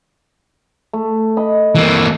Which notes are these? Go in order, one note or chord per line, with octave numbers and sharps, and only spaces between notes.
A3
D#5 B5
E3 A#3